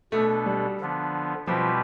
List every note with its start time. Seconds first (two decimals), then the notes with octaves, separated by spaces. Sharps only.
0.12 B2 A3 B3 D4 A4
0.46 G3
0.80 D3 F3 B3 D4
1.47 B2 F3 G3 C4 G4 B4